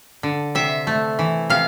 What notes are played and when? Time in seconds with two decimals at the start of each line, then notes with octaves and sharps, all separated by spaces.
0.23 D3
0.55 C3 E5
0.87 A3
1.19 E3
1.50 C3 F5